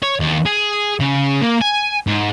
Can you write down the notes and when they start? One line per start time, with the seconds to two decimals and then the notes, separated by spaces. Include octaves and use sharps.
0.03 C#5
0.20 D#2
0.46 G#4
1.00 C#3
1.42 A#3
1.62 G#5
2.07 G#2